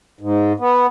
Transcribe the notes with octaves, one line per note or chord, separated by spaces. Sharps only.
G#2
B3